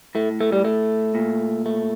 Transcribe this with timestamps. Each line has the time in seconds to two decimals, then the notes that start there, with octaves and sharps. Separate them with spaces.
0.15 A2 A3
0.41 A3
0.52 G3
0.65 A3
1.15 A#2
1.66 A3